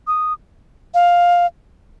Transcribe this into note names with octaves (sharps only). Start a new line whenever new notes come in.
D#6
F5